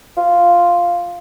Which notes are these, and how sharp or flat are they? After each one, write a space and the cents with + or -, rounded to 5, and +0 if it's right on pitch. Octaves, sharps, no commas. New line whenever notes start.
F4 +0